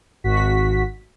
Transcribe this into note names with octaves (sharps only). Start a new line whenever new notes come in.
G#1 F#4 B6